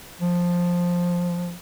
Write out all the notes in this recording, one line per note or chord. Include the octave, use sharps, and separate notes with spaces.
F3